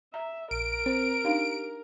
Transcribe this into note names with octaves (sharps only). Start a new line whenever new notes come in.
E5 A#5
A#1 A#4 D7
C4 C5
D4 D#4 G4 F5